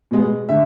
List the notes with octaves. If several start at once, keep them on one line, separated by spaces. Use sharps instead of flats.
B2 G#3 B3
D3 E5